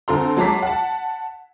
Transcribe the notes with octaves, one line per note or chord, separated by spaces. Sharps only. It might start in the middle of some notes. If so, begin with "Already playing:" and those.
D2 C4 A4 A#5 C6
F#3 G#3 A5 A#5 D6 B6
F#5 A5